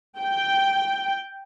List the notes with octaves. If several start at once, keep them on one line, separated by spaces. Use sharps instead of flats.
G5